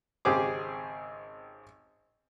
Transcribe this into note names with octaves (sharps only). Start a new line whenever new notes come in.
G#1 C#3 C4 G4 G#4 D6